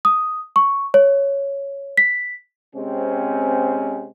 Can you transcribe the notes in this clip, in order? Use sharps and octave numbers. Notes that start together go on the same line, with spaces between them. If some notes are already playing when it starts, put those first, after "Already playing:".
D#6
C#6
C#5
B6
C3 G#3 C4 C#4